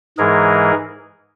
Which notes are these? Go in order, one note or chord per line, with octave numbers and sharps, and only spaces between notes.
G#2 E3 G#3 G#4 A#4